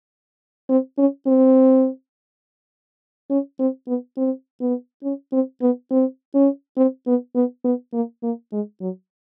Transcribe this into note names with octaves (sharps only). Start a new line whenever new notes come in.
C4
C#4
C4
C#4
C4
B3
C4
B3
C#4
C4
B3
C4
C#4
C4
B3
B3
B3
A#3
A#3
G#3
F#3